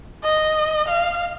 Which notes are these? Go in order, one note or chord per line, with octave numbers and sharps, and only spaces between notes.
D#5
F5